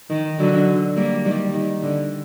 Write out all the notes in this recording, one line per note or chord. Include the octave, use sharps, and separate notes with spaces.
D#3
D3 F#3
G3 A#3
D#3 G3
D#3
D3